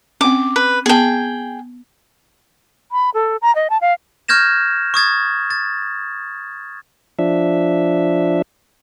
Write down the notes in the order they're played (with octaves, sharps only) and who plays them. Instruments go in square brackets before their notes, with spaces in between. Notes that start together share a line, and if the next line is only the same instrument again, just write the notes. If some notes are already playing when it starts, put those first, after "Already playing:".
[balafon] C4 C#4 [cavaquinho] D6
[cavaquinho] B4
[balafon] B3 A5 [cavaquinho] G#4 G5
[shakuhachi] B5
A4
A#5
D#5
A5
F5
[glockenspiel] C#6 F6 G6 G#6 A#6 E7
C#6 D#6 G#6 A6
A6
[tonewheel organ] F3 D4 E5